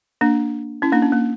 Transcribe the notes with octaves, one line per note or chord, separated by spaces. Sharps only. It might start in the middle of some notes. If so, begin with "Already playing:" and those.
A#3 D4
C#4 E4
A#3 D4
C#4
A#3